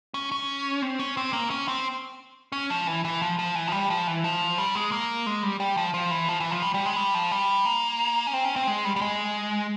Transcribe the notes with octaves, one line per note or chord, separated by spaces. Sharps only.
C#4
C#4
C4
C#4
C4
A#3
C#4
C4
C#4
F3
E3
E3
F3
F3
E3
F3
G3
F3
E3
F3
G3
G#3
A#3
G#3
G3
G3
F3
F3
E3
F3
E3
F3
G3
G3
G#3
G3
F3
G3
A#3
C#4
C4
C#4
C4
G#3
G3
G3
G#3